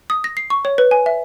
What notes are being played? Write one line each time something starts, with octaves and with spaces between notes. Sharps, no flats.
D#6
A#6
C7
C#6
C#5
B4
G#5
E5